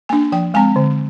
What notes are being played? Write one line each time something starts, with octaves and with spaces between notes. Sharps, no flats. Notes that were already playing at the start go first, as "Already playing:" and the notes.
A#3 D4 G#5
F3 G5
G#3 C4 G#5
D3